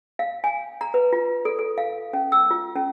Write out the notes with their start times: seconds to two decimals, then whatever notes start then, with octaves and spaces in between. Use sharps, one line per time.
0.19 F5
0.44 G#5
0.81 A#5
0.94 B4
1.13 F4
1.45 A4
1.59 A4
1.78 F5
2.13 C#4
2.32 E6
2.51 F4
2.76 C#4